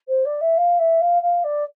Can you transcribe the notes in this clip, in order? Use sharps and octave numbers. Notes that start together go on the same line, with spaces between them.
C5
D5
E5
F5
E5
F5
F5
D5